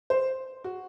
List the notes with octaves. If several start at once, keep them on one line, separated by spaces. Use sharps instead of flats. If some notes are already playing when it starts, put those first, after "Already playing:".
C5
F#4